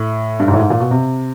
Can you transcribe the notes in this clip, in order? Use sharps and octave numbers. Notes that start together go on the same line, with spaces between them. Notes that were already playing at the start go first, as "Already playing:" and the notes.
Already playing: A2
G2
G#2
A2
G#2
A#2
B2
C3